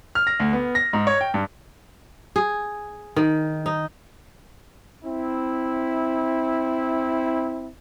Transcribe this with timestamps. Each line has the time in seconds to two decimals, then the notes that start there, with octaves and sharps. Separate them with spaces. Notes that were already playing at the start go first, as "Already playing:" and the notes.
0.15 F6
0.27 A#6
0.40 D2
0.53 B3
0.75 A#6
0.93 G#2
1.07 C#5
1.21 G5
1.34 G2
2.36 G#4
3.16 D#3
3.66 D#4
5.03 C4 E4